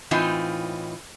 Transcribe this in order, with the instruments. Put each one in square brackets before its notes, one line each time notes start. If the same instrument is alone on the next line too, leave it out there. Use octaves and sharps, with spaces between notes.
[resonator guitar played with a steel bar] A2 E3 C4 D#4 F4